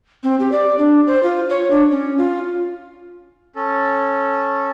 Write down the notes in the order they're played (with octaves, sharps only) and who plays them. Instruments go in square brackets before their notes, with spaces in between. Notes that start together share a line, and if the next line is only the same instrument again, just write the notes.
[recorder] C4
G4
D5
D4
C5
F4
C#5
D4
C#4
F4
[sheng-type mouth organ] C#4 A4